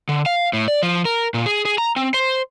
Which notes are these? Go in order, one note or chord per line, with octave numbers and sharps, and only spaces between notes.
D3
F5
A2
D5
F3
A#4
A#2
G#4
G#4
A#5
C4
C5